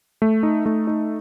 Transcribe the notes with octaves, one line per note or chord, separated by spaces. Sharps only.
A3
D#4
A3
D#4